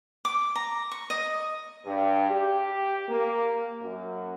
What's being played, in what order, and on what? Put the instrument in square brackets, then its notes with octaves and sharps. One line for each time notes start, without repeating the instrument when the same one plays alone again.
[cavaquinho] D6
A#5
C#6
D#5
[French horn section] G2
G4
A#3
F#2